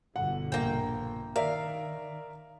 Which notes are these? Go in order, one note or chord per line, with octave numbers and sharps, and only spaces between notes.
G1 B2 D3 F#5
A#1 A#3 G5
D#3 A#4 D5 E5 F5